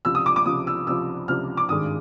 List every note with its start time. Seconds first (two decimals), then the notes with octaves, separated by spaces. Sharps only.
0.05 C#2 C3 F3 E6
0.15 D#6
0.26 D6
0.36 D6
0.46 C#2 C3 F3 D#6
0.67 E6
0.87 C#2 C3 F3 E6
1.28 C#2 C3 F3 F6
1.57 D6
1.69 G#1 G2 D#3 G#3 D#6